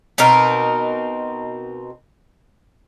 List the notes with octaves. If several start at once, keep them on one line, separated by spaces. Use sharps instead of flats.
B2 C4 D#4 A#4